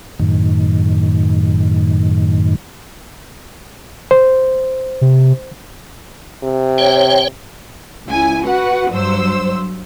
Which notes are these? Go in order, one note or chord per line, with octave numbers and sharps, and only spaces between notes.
F#2 A2 D#3
C5
C3
C3
C#5 G5
C#2 E4 G#5
F#4 B4 F#5
G2 F#3 C5 E6